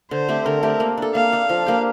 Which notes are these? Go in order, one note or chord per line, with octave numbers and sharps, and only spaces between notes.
D3 C5
A3 C4 G4
D3 A#4
A3 C4 G4
A#3
D4 A4
A#3 F5
D4 A4
F3
A#3 D4 G4